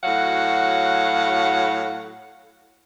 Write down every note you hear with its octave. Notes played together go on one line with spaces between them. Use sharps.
A2 F#3 F#4 F5 F#5